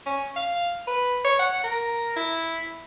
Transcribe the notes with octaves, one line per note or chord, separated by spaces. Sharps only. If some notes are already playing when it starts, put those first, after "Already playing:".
C#4
F5
B4
C#5
F#5
A#4
E4